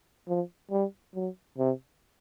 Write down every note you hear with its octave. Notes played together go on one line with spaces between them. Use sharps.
F3
G3
F#3
C3